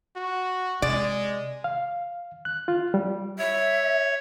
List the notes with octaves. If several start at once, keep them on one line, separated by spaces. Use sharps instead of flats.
F#4
C3 G#3 D5
F5
F#6
F4
G3
C#5 E5